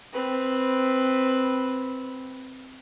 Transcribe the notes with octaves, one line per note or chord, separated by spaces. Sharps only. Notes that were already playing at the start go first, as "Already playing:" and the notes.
C4 B4